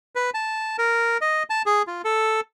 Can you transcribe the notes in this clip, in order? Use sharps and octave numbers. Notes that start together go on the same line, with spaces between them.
B4
A5
A#4
D#5
A5
G#4
F4
A4